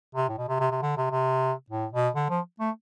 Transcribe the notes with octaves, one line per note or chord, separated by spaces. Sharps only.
C3
A2
B2
C3
C3
C3
D3
C3
C3
A2
B2
D3
F3
A3